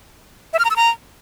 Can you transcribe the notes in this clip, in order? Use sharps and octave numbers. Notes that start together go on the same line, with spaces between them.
E5
F6
A#5
E6
A#5